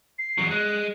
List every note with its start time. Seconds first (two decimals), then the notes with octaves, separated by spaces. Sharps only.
0.19 C7
0.38 E2 F#3
0.51 G#3 F#6